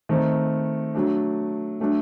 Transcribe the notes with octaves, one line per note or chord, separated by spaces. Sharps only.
D#3 A3 C4
F#3 A3 D4
F#3 A3 D4